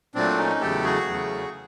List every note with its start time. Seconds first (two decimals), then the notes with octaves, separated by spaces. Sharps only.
0.15 A#2 F#3 A3 C4 D4
0.38 C#4 D#4
0.61 E2 C#3 F#3 A3 G4 A4
0.84 F#4 G#4
1.08 E2 C#3 F#3 A3